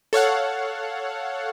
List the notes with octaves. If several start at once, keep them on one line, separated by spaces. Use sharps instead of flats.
A4 C#5 F5 F#5